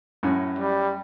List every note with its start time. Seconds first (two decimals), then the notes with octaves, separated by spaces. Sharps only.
0.23 F#2 A2 C#4
0.59 G3